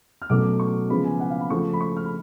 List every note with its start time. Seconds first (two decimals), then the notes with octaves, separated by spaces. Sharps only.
0.22 F6
0.30 B2 F#3 A3 C#4 D6
0.59 C#6
0.89 C#3 F3 G#3 B3 F4 B5
1.04 G#5
1.20 F#5
1.30 F5
1.41 B5
1.50 C#3 F3 A3 C#6
1.73 B5
1.80 C#6
1.96 F6
2.06 B5